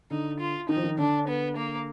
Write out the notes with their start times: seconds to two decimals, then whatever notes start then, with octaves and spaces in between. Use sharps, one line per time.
0.11 D3 D#4
0.40 F4
0.69 D#3 D#4
0.77 F3
0.84 D#3
0.98 D3 D4
1.28 B3
1.56 A#3